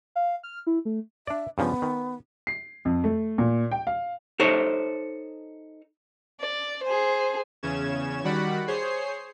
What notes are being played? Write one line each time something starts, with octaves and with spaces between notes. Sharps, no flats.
F5
F6
E4
A3
D4 D5 E5
G2 C#3 F3 B3
D#3
C7
F2
A3
A#2
G5
F5
D#4 A4 C5 C#5
D5
G#4 C5
E2 C#3 C#4 G#6 E7
D#3 G3 F#4 D5 F#5 B5
G#4 C5 C#5 C7